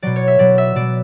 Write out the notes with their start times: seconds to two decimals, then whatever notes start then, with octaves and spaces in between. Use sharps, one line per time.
0.03 B2 F#3 D5
0.16 C#5
0.28 E5
0.39 B2 F#3 D5
0.58 E5
0.75 B2 F#3 D5